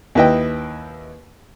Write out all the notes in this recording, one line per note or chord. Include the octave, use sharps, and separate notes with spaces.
D#2 E4 B4 D#5 G5